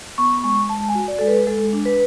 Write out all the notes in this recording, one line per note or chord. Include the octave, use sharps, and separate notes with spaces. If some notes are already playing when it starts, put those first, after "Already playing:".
B3 C#6
G#3 C#6
G#3 A5
G#5
F#4
D5
G#3 A4
B4
G#3 A4
D4
B4